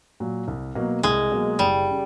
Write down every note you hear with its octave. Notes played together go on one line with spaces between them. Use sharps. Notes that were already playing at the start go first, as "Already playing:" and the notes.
A#2 F#3
C2
B2 F#3 A#3
C2 G#3
B2 F#3 A#3
F#1 G3
C#3